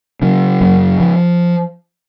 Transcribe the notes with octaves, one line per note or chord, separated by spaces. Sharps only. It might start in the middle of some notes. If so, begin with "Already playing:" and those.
C#3 F#3
F#2
F3